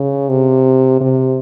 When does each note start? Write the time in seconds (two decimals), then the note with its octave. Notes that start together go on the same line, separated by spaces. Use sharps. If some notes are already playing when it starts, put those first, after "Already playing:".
Already playing: C#3
0.29 C3
1.01 C3